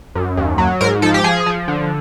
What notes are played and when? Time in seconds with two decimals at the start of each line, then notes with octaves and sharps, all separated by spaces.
0.15 F#2
0.37 D#2
0.58 F#3
0.81 G#2 A#4
1.02 F3 A4
1.14 G4
1.24 F3 G#4
1.46 F3
1.68 D3